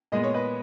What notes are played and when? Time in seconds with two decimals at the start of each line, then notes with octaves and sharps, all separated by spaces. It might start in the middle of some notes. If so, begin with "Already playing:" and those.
0.12 A#2 G#3 B3 D#5
0.24 C#5
0.34 B4 D#5